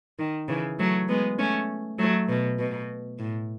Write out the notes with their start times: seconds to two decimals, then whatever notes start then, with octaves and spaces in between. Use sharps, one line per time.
0.19 D#3
0.48 C#3 E3
0.79 F#3 A3
1.08 G#3 B3
1.39 A3 C#4
1.99 F#3 A3
2.28 B2
2.59 B2
3.19 A2